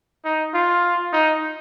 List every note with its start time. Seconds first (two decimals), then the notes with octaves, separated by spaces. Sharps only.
0.25 D#4
0.54 F4
1.13 D#4